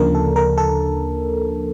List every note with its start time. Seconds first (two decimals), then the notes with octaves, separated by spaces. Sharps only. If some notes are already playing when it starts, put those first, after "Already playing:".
Already playing: D2 C#3 F3 A#3 D4 A#4
0.15 A4
0.36 A#4
0.58 A4